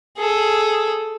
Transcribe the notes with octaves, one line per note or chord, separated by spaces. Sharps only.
G#4 A4